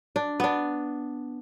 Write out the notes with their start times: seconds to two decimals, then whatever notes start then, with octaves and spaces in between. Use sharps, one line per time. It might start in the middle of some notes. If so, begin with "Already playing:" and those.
0.16 D4
0.40 B3 D4